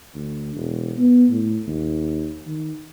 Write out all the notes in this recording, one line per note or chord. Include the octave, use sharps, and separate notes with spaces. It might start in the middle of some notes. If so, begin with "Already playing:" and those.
D2
E1
B3
A2
D#2
D#3